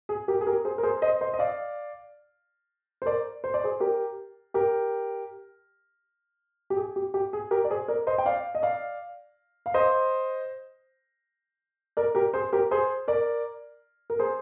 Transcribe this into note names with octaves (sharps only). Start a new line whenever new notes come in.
G#4
G4 A#4
G#4
G4 A#4
G#4 C5
A#4
G#4 C5
C5 D#5
C5 D#5
D#5
D5 F5
C5
A#4 D5
C5
D5
G#4 C5
G4 A#4
G4 A#4
G4
G#4
G4
G4
G#4
G4 A#4
D5
G#4 C5
A#4 D5
C5 D#5
G5
D5 F5
D#5
D5 F5
F5
C5 D#5
A#4 D5
G4 A#4
G#4 C5
G4 A#4
G#4 C5
A#4 D5
A#4
G#4 C5